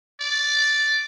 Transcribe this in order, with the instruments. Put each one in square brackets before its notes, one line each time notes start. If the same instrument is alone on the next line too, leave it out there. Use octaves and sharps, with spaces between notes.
[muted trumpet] D5